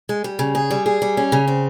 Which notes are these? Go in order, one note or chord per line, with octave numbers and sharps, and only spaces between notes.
G#3
G3
C#3
G#4
G3
G#4
G3
C#4
C#3
C4